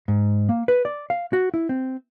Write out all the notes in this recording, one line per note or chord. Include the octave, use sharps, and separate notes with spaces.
G#2
A#3
B4
D5
F5
F#4
E4
C4